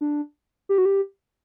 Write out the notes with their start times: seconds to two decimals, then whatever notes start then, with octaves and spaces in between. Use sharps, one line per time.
0.01 D4
0.69 G4
0.78 F#4
0.85 G4